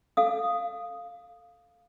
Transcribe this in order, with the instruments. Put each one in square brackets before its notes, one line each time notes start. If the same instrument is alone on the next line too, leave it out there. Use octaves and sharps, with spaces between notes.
[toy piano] A4 F5 D#6